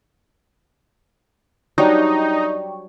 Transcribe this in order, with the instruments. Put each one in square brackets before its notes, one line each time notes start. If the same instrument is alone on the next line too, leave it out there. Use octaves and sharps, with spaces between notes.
[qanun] F#3 G3 D4 [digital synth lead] D#4 [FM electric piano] D5 G5 C#6